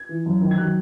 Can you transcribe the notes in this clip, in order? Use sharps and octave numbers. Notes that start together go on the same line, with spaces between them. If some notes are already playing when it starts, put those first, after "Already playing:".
Already playing: G#6
E3
F#2
D#3
G#6
F#3 F#6